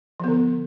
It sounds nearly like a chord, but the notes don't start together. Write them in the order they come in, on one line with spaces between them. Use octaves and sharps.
F3 B3 D3